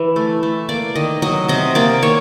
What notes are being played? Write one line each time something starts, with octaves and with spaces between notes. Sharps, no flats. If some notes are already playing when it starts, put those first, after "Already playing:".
Already playing: E3
A3
A3
A#3 D5
D#3 D#5
F#3 D#5
C3 D#5
A#3 D5
D#3 C#5